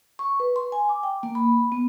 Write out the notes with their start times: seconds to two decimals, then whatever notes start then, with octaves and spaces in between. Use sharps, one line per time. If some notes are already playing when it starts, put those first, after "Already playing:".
0.19 C#6
0.40 B4
0.56 C6
0.72 G#5
0.89 D6
1.03 G5
1.23 A#3
1.35 B5
1.72 B3